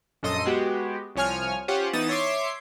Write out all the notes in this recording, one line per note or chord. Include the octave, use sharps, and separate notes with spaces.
A#1 F#2 A4 D#5 C6 D#6
G#3 B3 F#4 G4
C2 F3 C#5 G#5 F6
C#4 F4 G4 C5 F#5
E3 B3 D#4 D#6 A6 E7
C#5 E5 C6 D6 C7